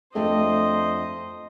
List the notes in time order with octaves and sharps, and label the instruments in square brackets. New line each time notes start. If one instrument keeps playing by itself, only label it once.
[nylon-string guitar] F2 A3 D4 [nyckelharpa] C5 D#5